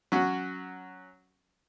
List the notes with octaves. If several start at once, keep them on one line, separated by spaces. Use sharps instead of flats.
F#3 C#4 F#4